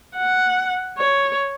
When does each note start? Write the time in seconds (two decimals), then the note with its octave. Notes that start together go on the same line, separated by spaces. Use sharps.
0.16 F#5
0.98 C#5